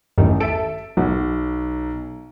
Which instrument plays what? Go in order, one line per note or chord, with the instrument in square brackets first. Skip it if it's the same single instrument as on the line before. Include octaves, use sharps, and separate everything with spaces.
[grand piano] A1 [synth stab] E2 G2 D#3
[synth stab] A4 [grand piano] E5 A5 D7
[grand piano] B1 [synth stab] F#3